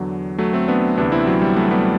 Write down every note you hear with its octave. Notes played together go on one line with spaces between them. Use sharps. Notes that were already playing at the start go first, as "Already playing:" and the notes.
Already playing: E2 D3 F#3
F#3 A3
A3 C4
B3 D4
D2 C3 E3 B3 D4
C4 E4
F#3
G3
F#3 A3
G3 B3